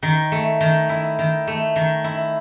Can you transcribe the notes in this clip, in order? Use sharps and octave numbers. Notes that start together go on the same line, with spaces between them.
D#3
A3
D#3
E4
D#3
A3
D#3
E4